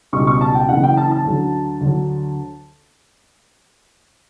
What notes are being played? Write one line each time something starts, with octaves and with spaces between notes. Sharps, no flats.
C#2 B2 G3 C#6
C#6
A5
G5
F#1 F#2 C#3 E3 F#5
G5
A5
A5
D2 D3 F#3
D2 D3 F#3